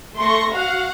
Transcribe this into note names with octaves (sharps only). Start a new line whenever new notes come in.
A3 C6 C#6 A#6
F#4 F5 F#5